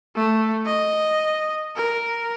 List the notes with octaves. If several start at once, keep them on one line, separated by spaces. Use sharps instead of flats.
A3
D#5
A#4